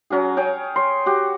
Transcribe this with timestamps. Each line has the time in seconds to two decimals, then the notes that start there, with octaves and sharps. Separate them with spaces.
0.10 F#3 C#4 F#4 G#4
0.37 C#4 G#4 C#5 G5
0.76 C#5 C6
1.06 F#4 G4